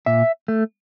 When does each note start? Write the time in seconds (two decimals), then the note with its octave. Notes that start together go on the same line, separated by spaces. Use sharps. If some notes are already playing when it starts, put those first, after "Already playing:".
0.06 A#2 E5
0.48 A3